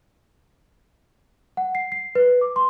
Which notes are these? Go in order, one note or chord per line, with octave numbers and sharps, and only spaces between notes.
F#5
C7
C7
B4
D6
C6